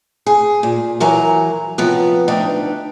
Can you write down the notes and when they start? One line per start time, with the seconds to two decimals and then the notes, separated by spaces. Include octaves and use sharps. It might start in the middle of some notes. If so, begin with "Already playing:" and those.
0.26 G#4
0.63 A#2
1.00 E3 F#3 A#4 G#5 A#5
1.78 C3 F3 F#3 B3 B4
2.28 D2 D4 D#4 B4 G5